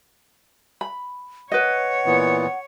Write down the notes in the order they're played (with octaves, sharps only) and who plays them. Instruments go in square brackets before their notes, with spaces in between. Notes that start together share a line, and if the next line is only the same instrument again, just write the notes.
[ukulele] B5
[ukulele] B4 D#5 [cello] C#5 [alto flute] F#5
[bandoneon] A#2 E3 B3